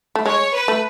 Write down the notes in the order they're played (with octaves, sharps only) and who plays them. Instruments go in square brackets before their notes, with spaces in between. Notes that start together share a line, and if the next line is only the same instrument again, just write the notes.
[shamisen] A3
[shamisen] G#3 [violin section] C#5
[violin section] B4
[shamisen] A3